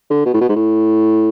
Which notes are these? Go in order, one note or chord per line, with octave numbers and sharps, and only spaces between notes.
D3
B2
A2
B2
G#2
A2